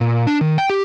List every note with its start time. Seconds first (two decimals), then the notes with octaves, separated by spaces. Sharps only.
0.01 A#2
0.27 D4
0.41 D#3
0.58 G5
0.70 G4